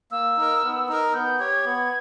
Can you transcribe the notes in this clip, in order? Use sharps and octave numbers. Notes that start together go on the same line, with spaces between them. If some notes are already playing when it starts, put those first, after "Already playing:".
A#3 E6
D#4 A#4
B3
D#4 A#4
B3 G6
G4 C#5 G#6
B3